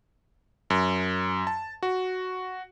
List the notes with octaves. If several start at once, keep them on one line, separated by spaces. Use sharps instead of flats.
F#2
A5
F#4